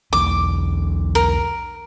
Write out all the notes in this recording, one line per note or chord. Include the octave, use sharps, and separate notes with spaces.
B1 E2 E3 D6
A#4